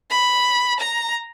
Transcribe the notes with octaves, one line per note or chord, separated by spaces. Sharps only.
B5
A#5